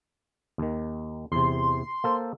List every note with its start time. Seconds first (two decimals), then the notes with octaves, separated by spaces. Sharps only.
0.58 D#2 D#3
1.32 E2 C3 C6
2.04 A#3 A4 C5